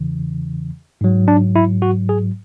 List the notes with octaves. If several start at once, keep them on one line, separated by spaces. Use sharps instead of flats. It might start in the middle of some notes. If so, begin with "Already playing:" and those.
Already playing: E2 C#3 E3
G#2 F#3
D4
E4
F#4
G#4